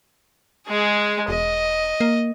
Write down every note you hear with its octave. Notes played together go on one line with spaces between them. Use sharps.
G#3 G#4
E1 D#5
A#3